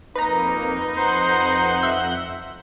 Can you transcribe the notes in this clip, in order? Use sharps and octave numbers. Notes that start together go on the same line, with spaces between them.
F2 A#3 D#4 B4 A#5
F2 C5 F#5 G6
E5